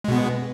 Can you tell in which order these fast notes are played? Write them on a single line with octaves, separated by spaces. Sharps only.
G#3 B2 B3